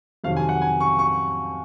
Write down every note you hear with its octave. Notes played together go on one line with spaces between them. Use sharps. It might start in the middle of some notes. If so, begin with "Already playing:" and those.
F2 C3 D#3 F#3 F5
G#5
F#5
G#5
C#6
C#6